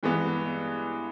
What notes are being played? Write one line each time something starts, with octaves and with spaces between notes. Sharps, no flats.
G2 E3 G#3 B3